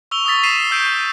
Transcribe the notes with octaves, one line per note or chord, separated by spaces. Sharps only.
C#6 E6 F7 G7
C#6 D#6 E6 A6 B6
B6 C7 D#7 E7
C#6 E6 G6 B6 D7